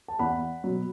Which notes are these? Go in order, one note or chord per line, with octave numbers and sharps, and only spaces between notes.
A5
E2 F#5 B5
B2 F#3